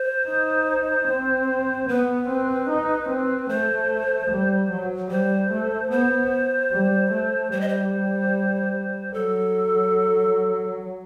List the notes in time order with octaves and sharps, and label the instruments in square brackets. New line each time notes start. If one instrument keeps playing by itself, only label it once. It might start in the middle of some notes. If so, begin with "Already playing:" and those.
Already playing: [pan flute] C5
[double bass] D#4
C4
[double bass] B3 [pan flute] B4
[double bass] C4
D#4
C4
[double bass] A3 [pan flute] C5
[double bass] G3
F#3
[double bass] G3 [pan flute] C5
[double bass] A3
[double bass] B3 [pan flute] C5
[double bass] G3
A3
[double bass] G3 [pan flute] C5
[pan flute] D#5
C5
[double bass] F#3 [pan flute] A4